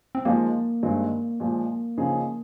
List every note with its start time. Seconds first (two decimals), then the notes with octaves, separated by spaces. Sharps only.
0.15 C4
0.25 F3 G#3 A#3 D#4 G#4
0.83 G2 D#3 G#3 C4
1.40 A#2 F3 G#3
1.98 C#3 F3 C4 D#4 G#4